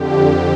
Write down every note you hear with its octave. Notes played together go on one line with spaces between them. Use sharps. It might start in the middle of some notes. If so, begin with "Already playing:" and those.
Already playing: F2 D3 G4